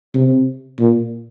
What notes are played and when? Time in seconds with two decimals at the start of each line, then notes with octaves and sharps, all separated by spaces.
0.14 C3
0.79 A#2